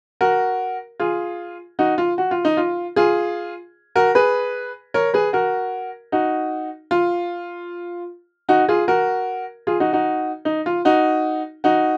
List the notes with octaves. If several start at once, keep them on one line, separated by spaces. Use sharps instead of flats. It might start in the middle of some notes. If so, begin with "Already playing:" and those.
F#4 A#4
F4 G#4
D#4 F#4
F4
F#4
F4
D#4
F4
F4 G#4
F#4 A#4
G#4 B4
A#4 C#5
G#4 B4
F#4 A#4
D#4 F#4
F4
D#4 F#4
F4 G#4
F#4 A#4
F4 G#4
D#4 F#4
D#4 F#4
D#4
F4
D#4 F#4
D#4 F#4